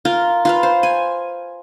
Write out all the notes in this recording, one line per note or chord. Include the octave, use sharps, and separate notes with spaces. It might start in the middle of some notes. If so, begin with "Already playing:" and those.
F4 A#4
F4 B4 F5
C5
G#5